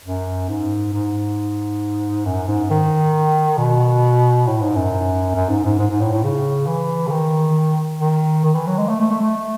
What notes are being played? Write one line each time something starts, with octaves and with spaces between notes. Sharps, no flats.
F#2
G#2
G#2
F#2
G#2
D#3
B2
A2
G#2
F#2
F#2
G#2
G#2
G#2
G#2
A2
A2
C#3
E3
C#3
D#3
D#3
D#3
E3
F#3
G#3
A3
A3
A3
A3